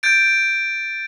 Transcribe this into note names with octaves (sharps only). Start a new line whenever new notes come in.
G6 A6 D7